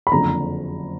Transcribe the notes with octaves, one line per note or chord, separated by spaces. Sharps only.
B5
F#1 F2 D3 A#5